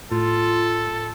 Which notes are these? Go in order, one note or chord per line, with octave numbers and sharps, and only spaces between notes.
A2 F4 A4